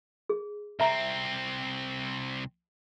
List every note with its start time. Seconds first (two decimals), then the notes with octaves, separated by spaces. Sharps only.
0.29 G#4
0.80 C2 C4 E5 A#5